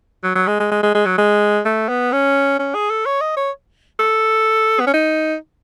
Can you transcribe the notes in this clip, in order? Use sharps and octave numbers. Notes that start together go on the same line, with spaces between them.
F#3
F#3
G#3
G#3
G#3
G#3
G#3
F#3
G#3
A3
B3
C#4
C#4
G#4
A4
C#5
D#5
C#5
A4
B3
C#4
D#4